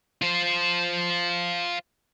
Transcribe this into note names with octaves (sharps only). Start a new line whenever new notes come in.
F4 C5